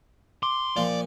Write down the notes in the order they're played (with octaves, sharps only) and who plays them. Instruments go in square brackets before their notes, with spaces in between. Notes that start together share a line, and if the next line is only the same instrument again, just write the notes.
[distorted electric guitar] C6 [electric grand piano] D6
[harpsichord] A#2 F3 [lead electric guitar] D5